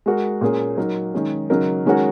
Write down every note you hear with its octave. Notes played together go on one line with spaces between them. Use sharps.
G#3 F#4 A#4
A#2 A#3 C#4 G#4
F#3 D#4 A#4
D#3 G#3 C#4 G#4
C#3 F#3 D#4 A#4
D#3 G#3 C#4 F#4 A#4